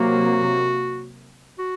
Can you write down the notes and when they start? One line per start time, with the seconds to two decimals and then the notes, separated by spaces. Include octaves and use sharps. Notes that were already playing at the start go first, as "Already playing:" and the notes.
Already playing: C3 F#3 A#3 F#4
1.59 F#4